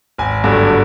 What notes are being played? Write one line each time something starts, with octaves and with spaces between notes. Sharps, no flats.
G#1 G#5
G2 D3 F#3 A3